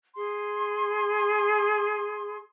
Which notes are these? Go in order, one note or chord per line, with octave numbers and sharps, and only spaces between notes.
G#4 C6